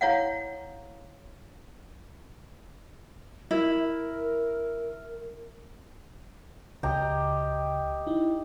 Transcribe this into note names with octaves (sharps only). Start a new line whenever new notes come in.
E4 C#5 F5 F#5
E4 A#4
C#2 C#3 G4 D#5 A#5
D#4 E4